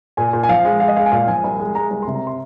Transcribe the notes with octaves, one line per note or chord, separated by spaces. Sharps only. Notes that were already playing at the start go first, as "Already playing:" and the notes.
A#2 G#5
A#2
G#5
F3 F5
G#3
G#3 F5
D#5
G#3 F5
G#5
A#2 F5
F3 G#5
C2
G#3
G#3 A#5
C2
C3 C6
A#5
C6